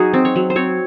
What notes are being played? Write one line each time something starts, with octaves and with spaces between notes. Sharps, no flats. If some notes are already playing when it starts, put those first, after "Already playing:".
Already playing: F#3 D#4 F#4 G#4
C4
C#5
F#3
C5
C4 C#5